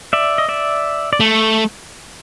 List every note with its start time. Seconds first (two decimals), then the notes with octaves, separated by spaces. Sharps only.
0.13 D5 E5
0.38 D#5
0.49 D5 E5
1.13 D5
1.20 A3